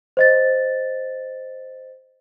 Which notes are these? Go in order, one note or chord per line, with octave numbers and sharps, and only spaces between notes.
C5 D#5 A6